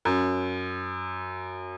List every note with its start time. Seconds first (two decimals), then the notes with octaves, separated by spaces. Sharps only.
0.05 F#2